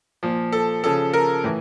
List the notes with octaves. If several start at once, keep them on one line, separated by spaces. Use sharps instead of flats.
A#2 F3
A4
C#3 F3 A4
A#4
A2 E3